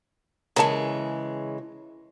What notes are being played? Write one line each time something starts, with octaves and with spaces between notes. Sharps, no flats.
C#3 E3 G#3 A#4 A5